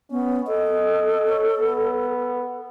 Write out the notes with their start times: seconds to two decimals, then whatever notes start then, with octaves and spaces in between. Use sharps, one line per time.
0.11 B3 C#4
0.47 A4 D#5
1.29 C#5
1.59 B3